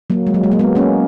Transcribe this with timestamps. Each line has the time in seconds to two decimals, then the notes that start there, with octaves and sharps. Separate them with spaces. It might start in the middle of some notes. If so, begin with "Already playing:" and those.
0.10 F#3 A#3
0.27 G#3
0.34 F#3
0.44 G#3
0.51 F#3 A#3
0.59 G#3 B3
0.75 A#3 C#4